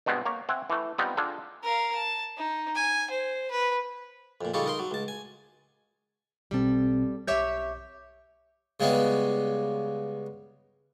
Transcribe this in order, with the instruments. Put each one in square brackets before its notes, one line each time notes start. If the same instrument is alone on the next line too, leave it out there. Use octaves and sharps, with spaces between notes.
[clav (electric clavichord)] G2 B2 G#3 B3 C4
A#3 C#5 A#5
C4 E5 F#5 G#5
E3 A3
G3 B3 C4 D#4 F4
D4 F4 G#4 A4
[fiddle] A#4 F5
A5
D#4
G#5
C5
B4
[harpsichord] F2 A#2
C#3 G3 D#4 F4 A4 C#5
D#4 A#4 C6
F#3
C#2 A5
G#5
[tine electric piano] B1 B2 C4 [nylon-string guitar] G3 A4
[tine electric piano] B1 D6 G6 [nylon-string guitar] G4 C#5 E5
[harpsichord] C#3 G3 G#3 B3